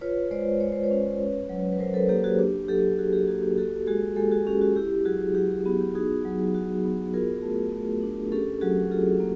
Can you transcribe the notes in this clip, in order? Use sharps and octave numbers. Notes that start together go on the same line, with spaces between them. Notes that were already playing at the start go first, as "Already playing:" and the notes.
F4 B4 C#5
G#3 C5 D5
G#3 C#5
C5
B4 C#5
C#4
C#4
F#3
B4
F#3 A#4 C5
A4 B4
A#3 G4 A4
F#4 G#4
D4 G4
F#3 G4 A4
F#4 G#4
G4 A4
A#3 F#4 G#4
G4
F#4 G4 A4
G#3 F#4 G#4
G#3 G4 A4
F#4 G#4
C#4 G4
F#4
E4 G4
F#3 F#4 G#4
F#3 G4
G4
B3 F#4
G4
D#4 F#4 G#4
F#3
F#4
B3
F4 G#4 A#4
A3
A3
D4
C#4 G4 A4
F#3 F#4 G#4
F4 G4 A4
A#3